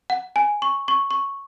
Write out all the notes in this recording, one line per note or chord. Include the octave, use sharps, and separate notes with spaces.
F#5
G#5
C#6
C#6
C#6